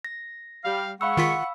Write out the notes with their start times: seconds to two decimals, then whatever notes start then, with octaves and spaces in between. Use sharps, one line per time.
0.05 A#6
0.64 G3 F5
1.01 G#3 F5 F#5 B5 C#6 E6
1.17 D#3 F4 B6